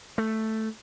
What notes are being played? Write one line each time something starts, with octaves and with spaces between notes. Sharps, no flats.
A3